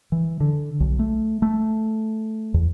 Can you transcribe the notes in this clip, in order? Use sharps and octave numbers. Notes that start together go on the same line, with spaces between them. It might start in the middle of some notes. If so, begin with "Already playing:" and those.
E3
D3
B1
A3
A3
E2